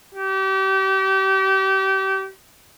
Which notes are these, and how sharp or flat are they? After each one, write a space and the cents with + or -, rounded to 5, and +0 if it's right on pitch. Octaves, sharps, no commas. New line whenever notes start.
G4 -30